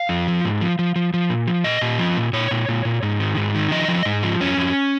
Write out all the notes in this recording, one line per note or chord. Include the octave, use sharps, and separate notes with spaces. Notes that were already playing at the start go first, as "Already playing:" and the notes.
Already playing: F5
F2
F3
G#2
F3
F3
F3
F3
A#2
F3
A#2 D#5
A#2
F3
A#2
A#2 C#5
A#2
A#2
A#2
G#2
D#3
G#2
D#3
F3 D#5
F3
G#2
F3
F2 C#4
F2